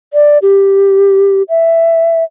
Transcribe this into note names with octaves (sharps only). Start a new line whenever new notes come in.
D5
G4
E5